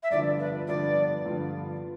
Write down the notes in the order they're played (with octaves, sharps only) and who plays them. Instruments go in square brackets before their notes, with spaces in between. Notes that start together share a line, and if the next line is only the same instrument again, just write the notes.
[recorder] E5
[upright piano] G2 D3 F3 B3 F4 [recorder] D5
[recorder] B4
[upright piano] G2 D3 F3 B3 F4 [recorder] D5
[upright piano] G2 D3 F3 B3 F4